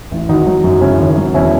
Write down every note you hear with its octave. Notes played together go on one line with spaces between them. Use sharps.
A1
G#1 D#4 F#4
F#3
F#2
C#3 C#4 E4
G#1
F#3
E1 C#4 E4